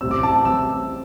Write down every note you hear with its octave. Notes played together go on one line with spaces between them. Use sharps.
A1 A2 G3 C4 E6
D6
A5
D6
A1 A2 G3 C4 E6